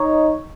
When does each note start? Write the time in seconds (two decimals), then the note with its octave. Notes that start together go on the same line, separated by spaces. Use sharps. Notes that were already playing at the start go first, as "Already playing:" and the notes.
Already playing: D#4 C#5